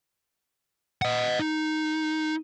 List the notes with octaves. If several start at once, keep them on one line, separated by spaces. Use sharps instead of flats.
D#5 F#5
D#4